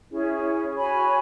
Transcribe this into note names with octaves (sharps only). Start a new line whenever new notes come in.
C#4 E4 G#4 C#5
F#4 C#5 G#5 B5